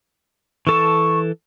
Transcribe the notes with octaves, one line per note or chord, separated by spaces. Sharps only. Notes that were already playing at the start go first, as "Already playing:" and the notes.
E3 A4 A5 C#6